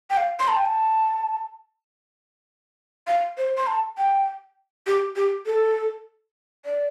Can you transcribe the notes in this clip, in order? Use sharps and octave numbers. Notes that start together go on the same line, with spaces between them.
G5
F5
C6
A5
G5
A5
F5
C5
C6
A5
G5
G4
G4
A4
D5